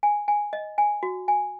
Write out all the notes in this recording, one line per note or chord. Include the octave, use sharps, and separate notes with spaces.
G#5
G#5
D#5
G#5
F#4
G#5